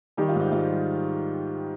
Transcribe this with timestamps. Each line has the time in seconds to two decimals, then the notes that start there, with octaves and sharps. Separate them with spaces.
0.17 D#3 G3 G4
0.29 F4
0.34 G#2
0.40 D#4
0.52 G#2 F4
0.68 G3